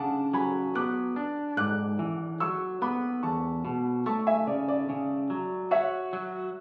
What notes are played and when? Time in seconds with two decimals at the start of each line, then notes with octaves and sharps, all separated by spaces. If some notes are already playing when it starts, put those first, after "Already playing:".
Already playing: C#3 D4 F#5 A5
0.33 F#3 G#5 B5
0.75 B3 D6 F#6
1.16 D4
1.57 G#2 D6 F#6
1.99 E3
2.40 F#3 C#6 E6
2.82 B3 B5 D6
3.23 E2 A5 C#6
3.65 B2
4.06 A3 A5 C#6
4.27 E5 G#5
4.47 C#3 D5
4.68 D5
4.89 C#3
5.30 F#3
5.71 F#4 C#5 E5
6.13 F#3